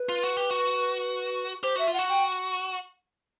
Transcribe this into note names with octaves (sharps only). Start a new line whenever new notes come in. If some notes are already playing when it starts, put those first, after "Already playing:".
Already playing: B4
F4
F#4
G4
F#4
G4 C5
F#4 E5
F4
F#5
F#4
G5